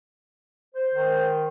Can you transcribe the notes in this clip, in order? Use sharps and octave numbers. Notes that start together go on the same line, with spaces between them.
C5
D#3